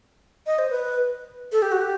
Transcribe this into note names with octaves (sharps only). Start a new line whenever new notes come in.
D#5
C5
B4
A4
G4
F#4
G4